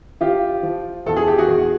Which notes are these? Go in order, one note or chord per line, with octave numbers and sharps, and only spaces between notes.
F3 F4 G4
F3
E2 A4
G#4
G4
F#4 G#4
E2